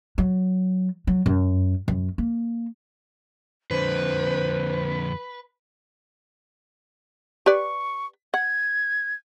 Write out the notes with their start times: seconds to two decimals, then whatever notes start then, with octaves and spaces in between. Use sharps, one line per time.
0.18 F#3
1.07 F#3
1.26 F#2
1.88 F#2
2.18 A#3
3.71 F2 D3 B4 C5
7.46 G4 B4 D5 C#6
8.34 F#5 G#6